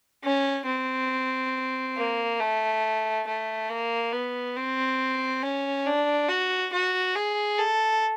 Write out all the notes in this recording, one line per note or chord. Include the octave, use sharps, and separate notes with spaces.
C#4
C4
A#3
A3
A3
A#3
B3
C4
C#4
D4
F#4
F#4
G#4
A4